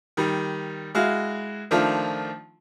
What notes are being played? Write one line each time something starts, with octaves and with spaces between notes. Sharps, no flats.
D#3 G3
G#3 E4 F#4 F5
D#3 F3 A3 D4 F4